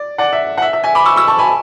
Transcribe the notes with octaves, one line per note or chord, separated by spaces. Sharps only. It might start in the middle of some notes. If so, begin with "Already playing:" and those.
Already playing: D5
D5 F#5
E5
F#5
E5
E5
E5 G#5
B5 D6
C#6 E6
C#6 E6
A5 C#6
G#5 B5